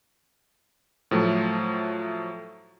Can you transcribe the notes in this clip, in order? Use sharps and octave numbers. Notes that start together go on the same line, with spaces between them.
A2 F3 F#3 A3